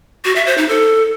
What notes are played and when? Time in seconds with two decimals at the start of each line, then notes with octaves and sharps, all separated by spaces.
0.25 F#4
0.36 E5
0.47 C5
0.58 D#4
0.69 A4